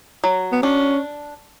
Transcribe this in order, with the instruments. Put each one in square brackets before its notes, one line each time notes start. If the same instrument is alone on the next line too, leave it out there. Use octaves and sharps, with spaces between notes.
[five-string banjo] F#3
[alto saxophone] B3
[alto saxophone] C#4 [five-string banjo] D4